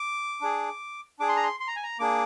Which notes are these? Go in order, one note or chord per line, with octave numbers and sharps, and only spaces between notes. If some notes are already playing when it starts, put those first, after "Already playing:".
Already playing: D6
D4 G#4
D4 G#4 D6
C6
A#5
C6
C6
A#5
G#5
A#5
A#3 D4 G#4 D6